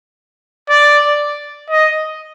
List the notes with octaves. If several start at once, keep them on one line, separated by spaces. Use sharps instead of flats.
D5
D#5